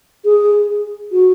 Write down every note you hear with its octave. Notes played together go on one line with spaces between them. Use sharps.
G#4
F#4